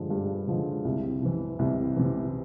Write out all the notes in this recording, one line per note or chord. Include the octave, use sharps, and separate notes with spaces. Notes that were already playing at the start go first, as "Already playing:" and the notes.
Already playing: G2 D3 F3 G#3
G2
D3 F3 G#3
C2
C3 E3
C2
C3 E3